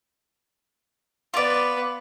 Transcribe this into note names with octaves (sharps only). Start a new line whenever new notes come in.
B3 F4 B4 D5